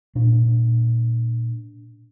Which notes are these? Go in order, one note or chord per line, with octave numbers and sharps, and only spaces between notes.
A#2 D4